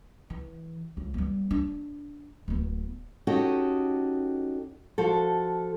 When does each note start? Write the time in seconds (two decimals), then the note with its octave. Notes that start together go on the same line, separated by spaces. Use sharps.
0.30 E3
0.97 C#2
1.14 G3 B3
1.51 D4
2.48 D1 B3
3.27 C#4 D#4 F#4 G4 A4 D#5
4.98 F3 F#4 A4